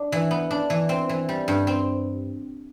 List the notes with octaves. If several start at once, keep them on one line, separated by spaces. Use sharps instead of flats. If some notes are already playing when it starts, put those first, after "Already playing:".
Already playing: D4
E3
B3
D4
E3
C4
E3
G3
G2
C4